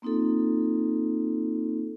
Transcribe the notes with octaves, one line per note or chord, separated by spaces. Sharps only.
A#3 C4 D#4 F4 A4